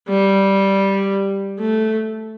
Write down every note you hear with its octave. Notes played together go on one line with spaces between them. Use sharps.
G3
A3